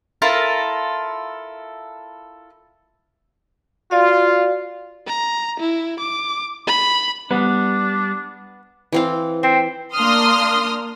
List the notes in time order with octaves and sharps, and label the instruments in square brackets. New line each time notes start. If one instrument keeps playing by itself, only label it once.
[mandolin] E4 F4 A4 A#4
[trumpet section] F4 [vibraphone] F#4 D5 F5
[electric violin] A#5
E4
D6
B5
[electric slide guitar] G3 [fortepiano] B3 [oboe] D4
[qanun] E3 C4 F5
[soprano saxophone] C4 [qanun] E5
[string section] A#3 D4 C6 D#6 F6